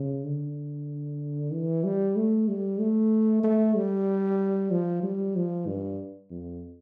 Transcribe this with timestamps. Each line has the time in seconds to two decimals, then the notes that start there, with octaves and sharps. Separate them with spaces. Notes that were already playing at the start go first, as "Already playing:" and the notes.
Already playing: C#3
0.24 D3
1.52 E3
1.84 G3
2.16 A3
2.48 G3
2.80 A3
3.43 A3
3.76 G3
4.71 F3
5.03 G3
5.36 F3
5.67 G2
6.30 F2